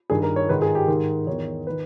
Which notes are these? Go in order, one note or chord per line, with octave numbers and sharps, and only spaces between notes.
G2 D#3 G#4
A#4
C#5
G#2 D#3 B4
G#4
G4
G#2 D#3
E2 D#3 C#5
D#3 B4